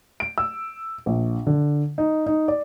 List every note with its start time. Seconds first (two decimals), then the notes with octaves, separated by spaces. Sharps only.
0.20 D7
0.38 E6
1.06 A#1
1.47 D3
1.98 D#4
2.26 D#4
2.48 D5